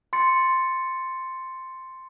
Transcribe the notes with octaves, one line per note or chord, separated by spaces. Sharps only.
C6 A6 C#7